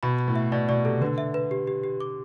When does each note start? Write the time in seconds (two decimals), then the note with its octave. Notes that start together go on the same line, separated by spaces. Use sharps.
0.03 B2 B5
0.19 B5
0.28 A2
0.36 E5
0.52 B2 D5
0.69 B2 D5
0.85 C3 A4
1.01 D3 B4
1.18 E5
1.34 B4
1.51 G4
1.67 G4
1.84 G4
2.00 D6